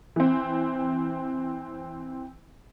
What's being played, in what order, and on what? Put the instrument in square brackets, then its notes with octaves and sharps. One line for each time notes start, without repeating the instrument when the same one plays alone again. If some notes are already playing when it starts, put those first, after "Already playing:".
[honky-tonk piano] E3 C4